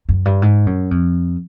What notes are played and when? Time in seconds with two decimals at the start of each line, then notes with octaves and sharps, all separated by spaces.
0.09 F#2
0.25 G2
0.42 G#2
0.67 F#2
0.91 F2